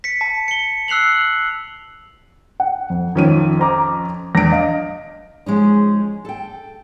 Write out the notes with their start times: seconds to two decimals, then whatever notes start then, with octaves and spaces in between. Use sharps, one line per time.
0.04 B6 C#7
0.21 A5
0.48 C#7 G7
0.88 E6 F#6 C7 F7 F#7
2.60 F#5
2.90 F2
3.15 F2 D#3 F3 C#4 D#7
3.59 C5 A#5 D6
4.35 E2 D4 A#6 D7
4.52 D#5 F5
5.46 F3 G#3 C#4 D#4
6.25 A4 G5